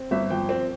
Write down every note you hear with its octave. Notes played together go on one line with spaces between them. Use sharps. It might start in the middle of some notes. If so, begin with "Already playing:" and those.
Already playing: C4
G1 E5
F3 G5
C4